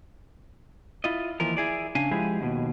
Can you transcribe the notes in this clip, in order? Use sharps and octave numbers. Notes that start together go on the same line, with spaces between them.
E4 F4 D#5
D#2 E3 F3 A#4
E4 G#4 D5
C#3 D4 F5 G#5
F3 G#3 E4 G4 G#4
D#2 B2